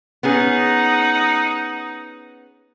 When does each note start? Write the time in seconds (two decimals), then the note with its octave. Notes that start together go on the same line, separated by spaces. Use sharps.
0.23 B3 C#4 D#4 G#4 F#5